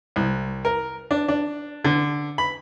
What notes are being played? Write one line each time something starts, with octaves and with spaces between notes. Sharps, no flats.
C2
A#4
D4
D4
D3
B5